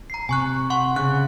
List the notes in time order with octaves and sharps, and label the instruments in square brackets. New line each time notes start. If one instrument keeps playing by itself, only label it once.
[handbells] A#5 C7
[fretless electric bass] C3 [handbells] G#5 C#6 F#6
[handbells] F#5 C6 C#6
[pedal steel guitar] C#3 [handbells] F#6